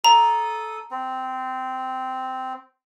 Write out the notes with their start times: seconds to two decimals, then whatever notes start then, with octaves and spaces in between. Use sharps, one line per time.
0.04 A4 A#5 D#6
0.91 C4